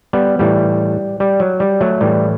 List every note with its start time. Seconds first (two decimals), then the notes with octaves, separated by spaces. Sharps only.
0.13 G3 B3
0.39 A2 E3 G3
1.20 G3
1.40 F#3
1.60 G3
1.81 F#3 A3
2.01 A2 E3 G3